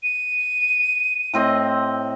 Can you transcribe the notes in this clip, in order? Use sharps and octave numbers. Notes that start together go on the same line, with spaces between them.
D#7
A2 C4 D#5